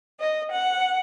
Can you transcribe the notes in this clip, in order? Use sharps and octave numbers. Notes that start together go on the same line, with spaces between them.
D#5
F#5